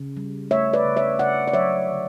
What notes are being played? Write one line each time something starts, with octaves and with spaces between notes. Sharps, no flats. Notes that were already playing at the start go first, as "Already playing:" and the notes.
Already playing: C#3
G3
A3 C#5 E5
B4 D5
C#3
C#5 E5
C#3 D5 F#5
D5
F#3 C#5 E5
D3